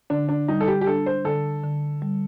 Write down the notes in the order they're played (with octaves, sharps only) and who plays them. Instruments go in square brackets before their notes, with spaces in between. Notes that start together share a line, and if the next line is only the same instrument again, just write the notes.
[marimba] D3 [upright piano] D4
[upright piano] D4
[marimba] G3 [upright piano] D#4
[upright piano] A4
G4
G4
[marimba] D4 [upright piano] A4
[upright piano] C5
[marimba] D3 [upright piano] A4
[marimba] D3
G3